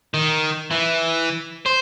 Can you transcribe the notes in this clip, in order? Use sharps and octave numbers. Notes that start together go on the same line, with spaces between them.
D#3
E3
C5